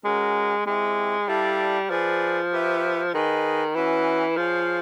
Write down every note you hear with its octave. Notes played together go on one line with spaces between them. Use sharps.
G#3 C#4 F#4 A#4
G#3 C4 E4 G4
G3 E4 A4 D5 F5 A5
F3 G#4 B4 D5
G4 B4 E5
D#3 G#4 B4 D#5
E3 C#4 F#4 B4 E5
F3 F4 G#4 C#5 F5